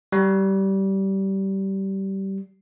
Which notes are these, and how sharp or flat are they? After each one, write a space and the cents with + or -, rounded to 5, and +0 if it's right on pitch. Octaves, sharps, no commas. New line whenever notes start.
G3 -20